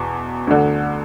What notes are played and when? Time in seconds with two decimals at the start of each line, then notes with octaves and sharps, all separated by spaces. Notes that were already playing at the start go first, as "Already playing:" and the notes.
Already playing: E2 B2
0.47 D2 D3